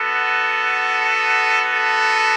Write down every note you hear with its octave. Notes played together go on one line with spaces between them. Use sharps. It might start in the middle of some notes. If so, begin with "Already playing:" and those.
Already playing: B3 F#4 A4
A4